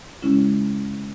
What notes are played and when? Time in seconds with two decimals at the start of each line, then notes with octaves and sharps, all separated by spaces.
0.22 C#3 G#3 C#4 E4